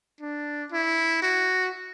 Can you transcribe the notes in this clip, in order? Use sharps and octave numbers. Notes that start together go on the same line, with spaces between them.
D4
E4
F#4